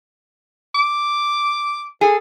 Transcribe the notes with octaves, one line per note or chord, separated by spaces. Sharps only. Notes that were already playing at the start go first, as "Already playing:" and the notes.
D6
G#4 A4